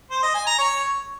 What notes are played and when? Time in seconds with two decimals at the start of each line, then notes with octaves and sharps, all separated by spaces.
0.11 C5
0.23 D#5
0.35 G#5
0.46 A#5
0.58 C#5